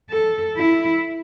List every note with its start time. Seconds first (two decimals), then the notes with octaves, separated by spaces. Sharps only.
0.10 A4
0.57 E4